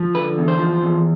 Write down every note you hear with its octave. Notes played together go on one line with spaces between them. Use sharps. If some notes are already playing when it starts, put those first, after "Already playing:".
Already playing: F3
D3 B4
E2
C5
F3
E2